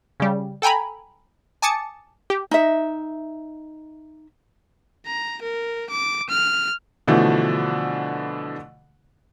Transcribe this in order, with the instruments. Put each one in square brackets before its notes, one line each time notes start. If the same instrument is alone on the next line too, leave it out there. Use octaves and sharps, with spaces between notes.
[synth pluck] C#3 G3
A4 G5 G#5 A#5 B5
G#5 A5 D6 D#6 A6 C#7
G4
[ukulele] D#4 E5
[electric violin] A#5
A#4
D6
F6
[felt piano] B2 D3 E3 F3 A3